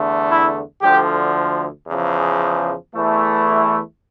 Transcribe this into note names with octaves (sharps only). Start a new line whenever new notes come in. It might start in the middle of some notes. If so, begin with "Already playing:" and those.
Already playing: E2 D3 A3
E4
D2 D3 F3 G4
E2 C#3 F3
E2 E3 A3
E4